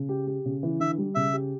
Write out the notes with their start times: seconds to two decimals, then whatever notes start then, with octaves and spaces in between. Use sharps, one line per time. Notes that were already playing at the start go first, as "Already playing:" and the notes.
Already playing: C#3
0.09 G4
0.27 G4
0.45 C#3
0.63 E3
0.80 D3 E5
0.98 G3
1.15 C#3 E5
1.33 G4